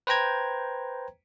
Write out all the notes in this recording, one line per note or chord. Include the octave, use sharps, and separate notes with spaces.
B4 C5 G5 A#5 G#6